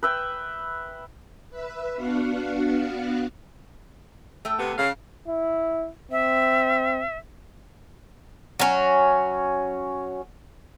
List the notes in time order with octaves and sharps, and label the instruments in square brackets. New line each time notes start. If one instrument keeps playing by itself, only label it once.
[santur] B4 E5 G5
[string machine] B4 E5
B3 D4 F#4 F5 F#5
[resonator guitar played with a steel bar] A3 A4 G5
[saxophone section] C3 B3
C#3 F5
[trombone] E4
[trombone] C4 [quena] E5
[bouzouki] F#3 C#4